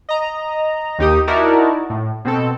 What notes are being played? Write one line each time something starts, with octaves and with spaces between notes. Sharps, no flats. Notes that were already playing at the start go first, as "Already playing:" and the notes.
D#5 A#5
D#2 D#4 G4 D#6
D#4 E4 F#4 A#4 D5 A5
A2
B2 C4 A4